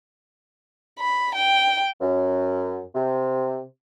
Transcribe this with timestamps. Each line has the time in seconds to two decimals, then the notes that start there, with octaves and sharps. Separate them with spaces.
0.99 B5
1.35 G5
2.01 F#2
2.94 C3